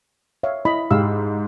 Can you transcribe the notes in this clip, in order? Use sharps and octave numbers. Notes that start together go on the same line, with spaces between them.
C#5 E5 F5
E4 D#5 B5
G#2 G4 F5 E6